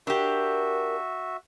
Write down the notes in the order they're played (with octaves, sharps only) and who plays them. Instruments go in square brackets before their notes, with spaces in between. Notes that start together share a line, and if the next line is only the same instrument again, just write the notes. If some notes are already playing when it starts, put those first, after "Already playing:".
[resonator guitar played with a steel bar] D4 G4 [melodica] F#4 E5 [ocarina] A#4